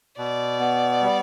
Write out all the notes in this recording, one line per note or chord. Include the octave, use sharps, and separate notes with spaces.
B2 D5
B3
G3